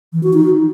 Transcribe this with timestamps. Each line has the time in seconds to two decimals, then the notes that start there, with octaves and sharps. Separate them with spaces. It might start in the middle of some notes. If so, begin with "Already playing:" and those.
0.13 E3
0.23 F#4
0.34 D#4